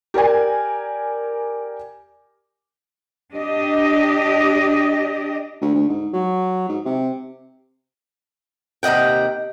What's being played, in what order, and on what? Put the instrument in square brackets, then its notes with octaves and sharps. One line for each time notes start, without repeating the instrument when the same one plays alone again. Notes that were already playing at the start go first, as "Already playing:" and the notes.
[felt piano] G4 A#4 D5 G#5
[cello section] D4 G4 D#5
[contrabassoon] D2
D2
G#2
F#3
G#2
C3
[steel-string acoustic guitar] D#2 C3 D#5 F#5 G5